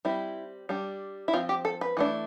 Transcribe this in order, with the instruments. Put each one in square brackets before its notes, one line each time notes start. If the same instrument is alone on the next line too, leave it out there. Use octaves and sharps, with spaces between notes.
[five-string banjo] G3 C4 E4
G3 D4
E4
F3 C4 F4
G4
A4
B4
E3 A3 D4